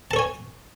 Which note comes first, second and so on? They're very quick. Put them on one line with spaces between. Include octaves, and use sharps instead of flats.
A5 A4 C#5 G#5